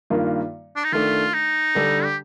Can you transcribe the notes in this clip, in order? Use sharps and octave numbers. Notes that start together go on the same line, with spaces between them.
G2 D#3 A#3 F4
D4
D#4
D#3 A3 D4 F4
D#4
D3 G3 D4 A4
G4